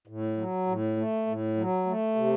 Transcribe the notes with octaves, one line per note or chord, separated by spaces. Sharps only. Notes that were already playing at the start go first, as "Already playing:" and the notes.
A2
F#3
A2
A3
A2
F#3
A3
C3